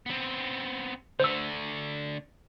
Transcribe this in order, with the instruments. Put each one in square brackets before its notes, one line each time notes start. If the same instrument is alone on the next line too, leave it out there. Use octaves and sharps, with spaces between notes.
[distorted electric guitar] B3 C4
[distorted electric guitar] D3 A3 [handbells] C5 E6